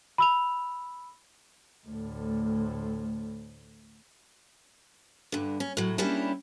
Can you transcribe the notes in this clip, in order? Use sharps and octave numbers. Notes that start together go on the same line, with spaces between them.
B5 E6 F7
D2 A2
G2 D3
C#4
A2 F#3
G3 A#3 C#4 D4 E4 G4